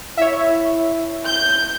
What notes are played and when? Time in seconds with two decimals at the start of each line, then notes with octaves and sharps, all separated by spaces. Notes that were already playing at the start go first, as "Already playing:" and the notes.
0.17 E4 C#5 E5
1.25 G6